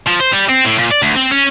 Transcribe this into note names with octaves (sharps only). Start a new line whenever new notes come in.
F3
C5
G3
C4
A2
A#2
D5
D2
C4
C#4